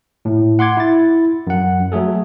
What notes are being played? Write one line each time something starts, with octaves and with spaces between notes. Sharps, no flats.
A2
F#5 C6 D6 G#6
E4 A6
F#2 F#5
F#3 A3 G#4 A4